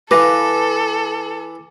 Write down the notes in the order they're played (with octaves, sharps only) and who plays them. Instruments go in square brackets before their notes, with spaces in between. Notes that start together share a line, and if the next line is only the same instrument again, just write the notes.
[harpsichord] E3 [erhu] A4 [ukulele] B4 F5 [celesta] D6 A#6